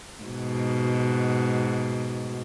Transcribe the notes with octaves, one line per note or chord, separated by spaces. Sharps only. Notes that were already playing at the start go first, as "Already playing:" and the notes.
G#2 B2